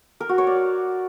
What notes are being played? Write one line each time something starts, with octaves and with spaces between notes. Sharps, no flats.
A#4
F#4
C#5
D5